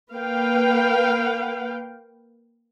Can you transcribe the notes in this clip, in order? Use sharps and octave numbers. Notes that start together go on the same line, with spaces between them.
A#3 B4 F5 G5